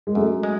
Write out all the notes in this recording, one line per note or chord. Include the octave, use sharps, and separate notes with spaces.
G#3
F#2 A3
G#3